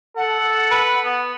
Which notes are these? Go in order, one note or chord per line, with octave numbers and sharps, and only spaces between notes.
A4 F#5
B4
B3